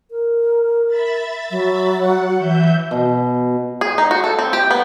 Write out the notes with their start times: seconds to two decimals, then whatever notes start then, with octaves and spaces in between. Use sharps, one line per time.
0.11 A#4
0.87 E5 B5 A6
1.51 F#3
1.93 F#5
2.38 E3 E5 G6
2.91 B2
3.81 G#4
3.98 D#4
4.11 F#4
4.24 A4
4.39 C4
4.53 G4
4.71 B3